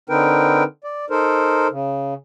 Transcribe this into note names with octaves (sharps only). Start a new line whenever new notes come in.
D3 C4 D#4 A#4 B4 G5
D5
D#4 A4 A#4 C5
C#3